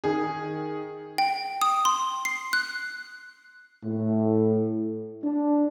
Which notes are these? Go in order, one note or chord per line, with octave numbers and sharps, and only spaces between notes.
D#3 G#4
G5
D#6
C6
C7
F#6
A2
D4